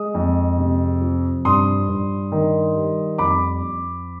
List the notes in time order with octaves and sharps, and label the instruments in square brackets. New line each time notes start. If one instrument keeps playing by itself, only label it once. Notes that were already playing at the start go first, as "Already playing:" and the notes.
Already playing: [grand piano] G#3 D#6
F2
C3
F3
G2 C6 D#6
G2
D#3
G3
F2 B5 D6
F2